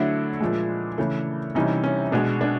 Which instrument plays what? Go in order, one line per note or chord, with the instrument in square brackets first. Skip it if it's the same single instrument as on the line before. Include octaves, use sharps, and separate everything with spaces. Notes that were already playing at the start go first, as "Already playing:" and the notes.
Already playing: [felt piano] D3 F#3 A3 D4 E4
A#2 F3 G#3
C#3 E3 A3
C3 E3 G3 C#4 D#4
C#4
B2 G#3 D4
D4